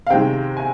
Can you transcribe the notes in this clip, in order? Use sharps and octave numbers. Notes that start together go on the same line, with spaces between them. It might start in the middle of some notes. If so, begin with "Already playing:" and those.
F5
C3 D#3 G#3 G5
G#5